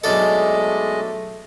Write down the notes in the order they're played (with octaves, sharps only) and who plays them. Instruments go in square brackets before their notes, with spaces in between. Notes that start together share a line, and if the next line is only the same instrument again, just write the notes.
[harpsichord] B1 D4 A4 [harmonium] G#3 D#5 [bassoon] A3